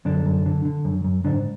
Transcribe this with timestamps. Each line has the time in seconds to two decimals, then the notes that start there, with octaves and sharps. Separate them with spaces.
0.05 F#2 D3 D4
0.26 F#2
0.46 D3
0.65 D3
0.85 F#2
1.04 F#2
1.24 G#2 D3 D4